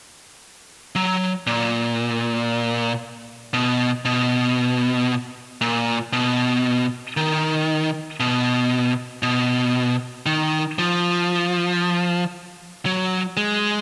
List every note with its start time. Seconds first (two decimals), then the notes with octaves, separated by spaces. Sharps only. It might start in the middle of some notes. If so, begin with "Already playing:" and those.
0.95 F#3
1.47 A#2
3.53 B2
4.05 B2
5.61 A#2
6.13 B2
7.17 D#3
8.20 B2
9.23 B2
10.26 D#3
10.79 F3
12.86 F#3
13.37 G#3